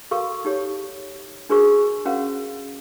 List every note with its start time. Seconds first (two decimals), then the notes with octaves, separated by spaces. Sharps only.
0.11 F#4 A4 A#4 F5 C#6
0.45 D#4 G4 C#5
1.49 D4 F#4 G#4 A#4 C5 C#6
2.05 C#4 F#4 A#4 C5 F5 F#5